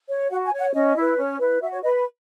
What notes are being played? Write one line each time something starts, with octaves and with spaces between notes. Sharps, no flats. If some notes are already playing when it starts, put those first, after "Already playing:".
C#5
F#4 F#5
G#5
C#5
F#5
C#4 D#5
E4 B4
C#4
E4 B4
F#4 E5
C#5
B4 D#5